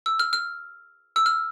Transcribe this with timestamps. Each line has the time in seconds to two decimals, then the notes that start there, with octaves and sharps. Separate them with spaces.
0.06 E6
0.19 F6
0.33 F6
1.16 E6
1.26 F6